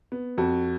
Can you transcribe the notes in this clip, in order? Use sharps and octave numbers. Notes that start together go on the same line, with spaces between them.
B3
F2 F#4